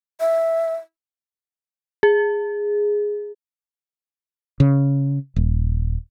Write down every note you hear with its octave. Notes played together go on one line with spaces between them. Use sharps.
E5
G#4
C#3
D#1